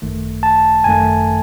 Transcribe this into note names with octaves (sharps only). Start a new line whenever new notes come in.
G#1 F#2 D#3 A3
A5
G#1 F#2 D#3 A3 G#5